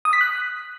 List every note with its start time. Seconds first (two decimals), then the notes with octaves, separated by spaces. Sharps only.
0.05 D#6
0.13 B6
0.21 F#6